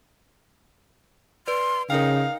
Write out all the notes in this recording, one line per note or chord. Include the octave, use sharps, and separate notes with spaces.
B4 D5 C6
C#3 D#4 A#4 F5 G5